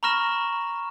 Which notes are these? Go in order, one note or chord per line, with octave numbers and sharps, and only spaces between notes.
A#5 B5 C#6 F6 A#6 E7